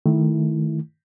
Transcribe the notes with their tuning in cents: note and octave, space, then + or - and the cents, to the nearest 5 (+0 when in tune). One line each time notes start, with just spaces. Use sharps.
D#3 +0 A3 -10 E4 +0